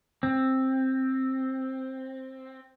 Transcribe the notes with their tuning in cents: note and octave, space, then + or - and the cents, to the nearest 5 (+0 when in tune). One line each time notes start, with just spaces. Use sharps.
C4 +10